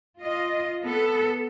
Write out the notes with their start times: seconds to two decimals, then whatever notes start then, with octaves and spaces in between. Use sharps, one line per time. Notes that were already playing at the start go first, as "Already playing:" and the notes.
0.21 F4 D#5
0.83 B3 A4